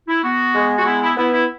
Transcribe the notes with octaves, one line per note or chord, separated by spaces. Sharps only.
E4
B3 F#4
G#3
F#4
B3 E4
E4
B3 E4
E4